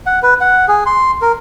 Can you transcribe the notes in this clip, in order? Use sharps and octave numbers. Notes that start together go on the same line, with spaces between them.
F#5
B4
F#5
G#4
C6
A#4